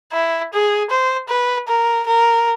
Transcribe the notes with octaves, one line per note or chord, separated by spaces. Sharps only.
E4
G#4
C5
B4
A#4
A#4